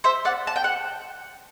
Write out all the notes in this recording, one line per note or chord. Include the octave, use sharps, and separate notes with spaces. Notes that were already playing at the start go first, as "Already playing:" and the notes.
C5 E5
D5 F#5
A5
G5
F#5